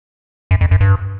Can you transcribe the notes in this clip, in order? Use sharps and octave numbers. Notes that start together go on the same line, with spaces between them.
F#2
F2
F#2
G2